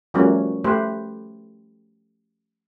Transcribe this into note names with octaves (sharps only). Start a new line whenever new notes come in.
F3 G3 A3 A#3 C#4 F#4
A3 G4 B4 C5